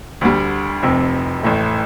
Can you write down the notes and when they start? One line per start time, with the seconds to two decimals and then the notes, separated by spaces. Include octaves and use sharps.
0.21 D2 D3 G3
0.83 F1 F2 C3
1.43 A1 A2 A3